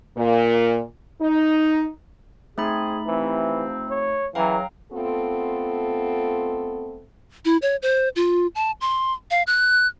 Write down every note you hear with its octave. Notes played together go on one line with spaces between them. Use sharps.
A#2
D#4
A3 C4 D#4 G#4 B5
C3 E3 F3 C4
C#5
C#3 E3 F#3 F5 G5 A#5
A3 B3 C4 F4 A4
E4
C#5
C5
F4
A5
C6
F5
F#6